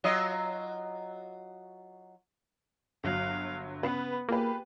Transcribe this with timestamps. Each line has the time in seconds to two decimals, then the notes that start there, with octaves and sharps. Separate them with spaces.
0.04 F#3 F4 D#5
3.04 G1 F#3 F5 F#6
3.83 C#3 B3 B4
4.28 A#3 F4 G4 G#4 B4